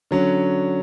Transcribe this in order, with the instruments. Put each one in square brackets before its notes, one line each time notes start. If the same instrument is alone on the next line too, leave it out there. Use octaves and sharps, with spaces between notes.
[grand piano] D3 F#3 C#4